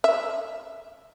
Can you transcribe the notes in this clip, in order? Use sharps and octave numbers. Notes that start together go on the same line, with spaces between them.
E5